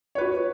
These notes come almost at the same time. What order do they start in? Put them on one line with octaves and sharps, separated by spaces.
C#5 B4 F#4